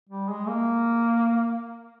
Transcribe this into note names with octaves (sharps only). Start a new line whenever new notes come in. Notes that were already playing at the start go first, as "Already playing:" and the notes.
G3
G#3
A#3